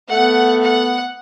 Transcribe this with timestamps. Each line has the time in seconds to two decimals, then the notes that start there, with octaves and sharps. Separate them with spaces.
0.11 A3 B3 F#5
0.63 F#5